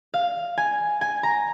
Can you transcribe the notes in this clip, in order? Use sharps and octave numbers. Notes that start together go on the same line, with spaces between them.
F5
G#5
G#5
A#5